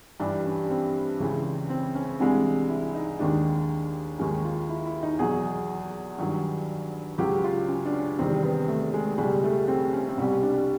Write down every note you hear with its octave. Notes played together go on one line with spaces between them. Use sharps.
G2 E3 G3 D4
C#4
C4
C#2 C#3 E3
C4
C#4
C2 C3 E3 G#3 D4
E4
D#4
D#2 D#3 G#3 D4
D#2 D#3 G#3 C#4
F4
E4
E4
D#4
E2 B2 F#3 G#4
G2 D#3 F#3
C#2 C#3 F#3 G4
F4
C#4
D4
C#4
E2 C3 D#3 G3 C4
B3
A3
G#3
C#2 B2 G3 G#3
A3
C4
C#4
C4
C2 B2 G3 C#4
D4